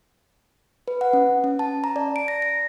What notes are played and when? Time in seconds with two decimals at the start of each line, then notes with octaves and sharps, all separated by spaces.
0.88 B4
1.01 F#5
1.13 C#4
1.44 C#4
1.59 A5
1.84 A#5
1.96 D5
2.16 D7
2.28 A#6
2.42 A#6